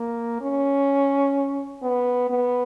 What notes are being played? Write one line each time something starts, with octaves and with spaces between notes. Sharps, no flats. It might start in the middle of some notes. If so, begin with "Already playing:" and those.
Already playing: A#3
C#4
B3
B3